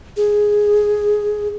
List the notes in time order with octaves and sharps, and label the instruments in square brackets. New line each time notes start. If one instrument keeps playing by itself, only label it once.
[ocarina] G#4